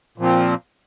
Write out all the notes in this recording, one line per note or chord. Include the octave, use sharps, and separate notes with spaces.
A#2 F3 C4